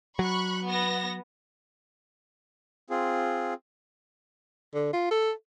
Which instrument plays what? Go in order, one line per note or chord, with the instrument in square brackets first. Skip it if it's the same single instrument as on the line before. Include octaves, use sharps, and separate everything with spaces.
[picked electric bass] F#3 [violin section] B5 C#6 F#6
[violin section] B3 A#6
[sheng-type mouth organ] C4 F4 G#4
[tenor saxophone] D3
F4
A4